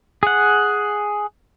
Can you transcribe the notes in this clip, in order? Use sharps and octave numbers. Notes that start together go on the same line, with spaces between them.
G#4 F#5